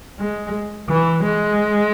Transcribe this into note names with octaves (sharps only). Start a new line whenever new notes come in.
G#3
E3
G#3